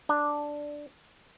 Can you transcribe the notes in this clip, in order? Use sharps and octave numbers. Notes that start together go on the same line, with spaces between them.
D4